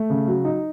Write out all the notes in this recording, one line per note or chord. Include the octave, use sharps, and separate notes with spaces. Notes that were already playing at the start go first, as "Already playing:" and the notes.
Already playing: A3
C#3
F#3
D#4